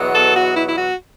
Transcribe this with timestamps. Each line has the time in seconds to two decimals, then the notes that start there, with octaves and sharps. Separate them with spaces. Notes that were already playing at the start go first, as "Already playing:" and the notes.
Already playing: E2 B2 F#3 B3
0.14 A4
0.35 F#4
0.56 E4
0.67 E4
0.77 F#4